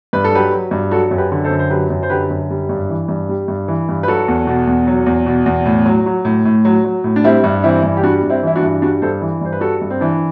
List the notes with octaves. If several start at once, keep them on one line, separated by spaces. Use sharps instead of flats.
G2 B4
A4
F#3 G4 B4
F#3
G2
F#3 F#4 A4
F#2
G4 B4
D3
A4 C5
F#2
C5
F#3 G4 B4
F#2
C5
D3 G4 B4
F#2
G3
G2
E3
G2
G3
G2
E3
G2
B4
F#3 F#4 A4
E2
B2
E2
F#3
E2
B2
E2
A2
F#3
F#3
A2
A2
F#3
F#3
A2
D4
G3 C4 E4
G2
E3 C4 E4
G2
G4
G3 D4 F#4
G2
C4 E4
E3 E4
D4 F#4
G2
G3 D4 F#4
G2 A4 C5
E3
G2 C5
B4
G3 F#4 A4
G2
C4
E3 D4